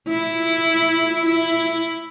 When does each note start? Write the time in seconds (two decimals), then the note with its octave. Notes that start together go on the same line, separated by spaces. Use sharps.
0.09 E4
1.25 E4